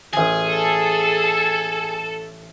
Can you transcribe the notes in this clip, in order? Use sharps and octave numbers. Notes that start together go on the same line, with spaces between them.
A1 G#4 G#5
A4